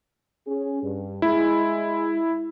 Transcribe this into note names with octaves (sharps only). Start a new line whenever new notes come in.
C#4 G#4
G2
G#3 E4